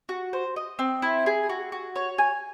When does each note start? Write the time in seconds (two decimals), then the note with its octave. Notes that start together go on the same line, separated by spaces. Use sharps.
0.09 F#4
0.33 C5
0.56 D#5
0.79 C4
1.02 E4
1.26 G#4
1.49 F#4
1.72 F#4
1.96 C#5
2.18 G#5